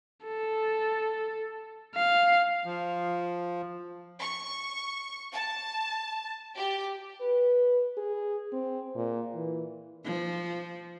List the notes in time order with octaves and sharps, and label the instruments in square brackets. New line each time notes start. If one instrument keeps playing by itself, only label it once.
[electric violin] A4
F5
[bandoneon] F3
[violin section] C#6
A5
G4
[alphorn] B4
G#4
C4
A#2
E3
[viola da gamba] F3